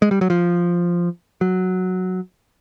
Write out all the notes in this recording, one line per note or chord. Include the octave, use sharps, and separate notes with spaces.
G#3
G3
F#3
F3
F#3